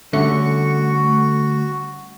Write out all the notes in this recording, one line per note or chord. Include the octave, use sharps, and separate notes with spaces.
D3 G3 A3 C#4 D4 F#4 C#7